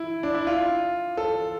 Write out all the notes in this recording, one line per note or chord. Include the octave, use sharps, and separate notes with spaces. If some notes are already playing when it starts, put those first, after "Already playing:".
Already playing: E4
D4
E4
F4
A4